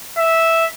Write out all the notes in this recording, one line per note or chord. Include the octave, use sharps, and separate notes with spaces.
E5